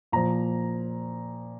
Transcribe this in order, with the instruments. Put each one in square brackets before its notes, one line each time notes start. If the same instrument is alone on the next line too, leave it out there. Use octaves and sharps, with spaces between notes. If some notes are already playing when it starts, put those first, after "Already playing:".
[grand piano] A#2 F3 A#5